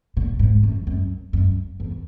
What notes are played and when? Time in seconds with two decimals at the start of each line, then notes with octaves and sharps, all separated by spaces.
0.17 A#2
0.39 G#2
0.63 F#2
0.87 F#2
1.33 F#2
1.80 E2